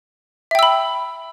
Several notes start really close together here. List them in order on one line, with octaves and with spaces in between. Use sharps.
E5 G5 E6 B5